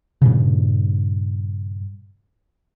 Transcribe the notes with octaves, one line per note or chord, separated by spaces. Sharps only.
G2 A#2 C#3